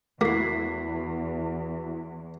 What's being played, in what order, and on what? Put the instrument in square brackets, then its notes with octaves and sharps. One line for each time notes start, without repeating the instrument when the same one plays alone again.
[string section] E2 [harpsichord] A#3 [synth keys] E4 F#4 [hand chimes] B6 C7